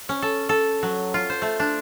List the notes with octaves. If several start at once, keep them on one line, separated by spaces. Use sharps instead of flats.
C#4
A4
A4
F#3
F4
C5
A3
D4